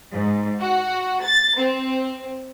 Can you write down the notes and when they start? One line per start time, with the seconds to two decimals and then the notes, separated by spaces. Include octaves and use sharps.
0.12 G#2
0.60 F#4
1.23 A6
1.57 C4